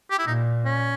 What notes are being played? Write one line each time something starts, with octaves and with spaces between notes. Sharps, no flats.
G4
E4
A#2 D#4
C#4